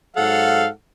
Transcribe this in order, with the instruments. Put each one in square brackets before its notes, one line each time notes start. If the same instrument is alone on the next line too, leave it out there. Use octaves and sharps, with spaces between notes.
[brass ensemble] G#2 F#3 F5 [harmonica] A4 F#5